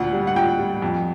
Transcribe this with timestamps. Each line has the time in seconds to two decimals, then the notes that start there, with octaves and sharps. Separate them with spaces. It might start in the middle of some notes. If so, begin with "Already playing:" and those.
Already playing: D2 A#2 F#5
0.13 G3
0.27 F#5
0.35 A#2 G5
0.59 G3
0.82 F2